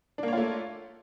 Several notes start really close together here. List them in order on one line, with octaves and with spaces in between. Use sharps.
D4 A#3 C#5 F4 A3